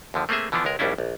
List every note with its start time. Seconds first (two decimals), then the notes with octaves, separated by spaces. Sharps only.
0.14 D#2 D3 F3
0.29 A3 A#3 C4 G#4 E5
0.52 D3 E3 F3 B3 D4
0.65 C#2 G#3 A#4
0.79 A#1 D#2 G3 C#4 D4 E4
0.98 A#1